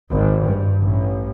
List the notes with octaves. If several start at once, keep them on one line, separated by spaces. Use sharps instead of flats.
G#1
G2
A1